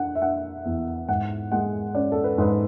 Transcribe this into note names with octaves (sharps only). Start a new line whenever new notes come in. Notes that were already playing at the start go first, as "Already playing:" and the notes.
Already playing: D4 F#5
E5
D4 F#5
E2
G#2 F#5
G#3 F#5
C#4 D5
A4
B4
G#2 B4